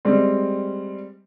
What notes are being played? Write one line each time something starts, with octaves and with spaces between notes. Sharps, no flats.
G3 G#3 C4